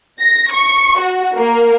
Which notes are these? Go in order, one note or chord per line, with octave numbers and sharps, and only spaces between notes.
A#6
C#6
F#4
A#3